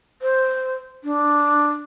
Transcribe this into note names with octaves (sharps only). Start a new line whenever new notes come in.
C5
D4